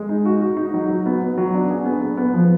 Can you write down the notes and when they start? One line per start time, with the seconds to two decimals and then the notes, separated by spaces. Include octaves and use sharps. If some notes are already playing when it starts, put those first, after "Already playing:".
Already playing: G#3
0.09 D#4
0.25 F#4
0.41 F#4
0.57 D#4
0.74 F#3
0.90 F#3
1.06 B3
1.22 B3
1.38 F#3
1.54 D4
1.70 G#4
1.85 B3
2.01 B3
2.17 B3
2.34 F3